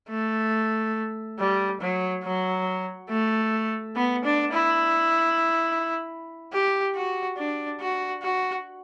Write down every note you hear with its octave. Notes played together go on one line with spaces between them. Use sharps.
A3
G3
F#3
F#3
A3
B3
D4
E4
G4
F#4
D4
F#4
F#4